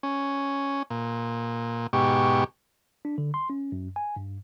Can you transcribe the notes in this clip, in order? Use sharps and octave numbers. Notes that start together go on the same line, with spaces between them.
C#4
A#2
G#2 B2 G4 C#6
D4
D3
C6
C#4
F#2
G#5
G2